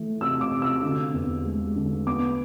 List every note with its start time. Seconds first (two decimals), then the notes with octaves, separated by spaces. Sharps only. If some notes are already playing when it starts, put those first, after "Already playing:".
Already playing: E3 A3
0.21 C3 E6
0.41 D6
0.51 C3
0.62 E6
0.83 D3
1.14 E2
1.45 G#3
1.76 D3
2.07 B3 D6